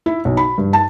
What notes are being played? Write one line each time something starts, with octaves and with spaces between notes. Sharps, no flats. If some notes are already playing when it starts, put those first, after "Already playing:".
E4
B1
B5
G2
A5